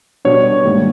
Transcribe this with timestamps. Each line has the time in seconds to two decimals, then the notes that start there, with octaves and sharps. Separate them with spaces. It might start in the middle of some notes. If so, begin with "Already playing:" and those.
0.25 B2 G3 B3 D4 C#5
0.64 G#2 D#3 G3 A#3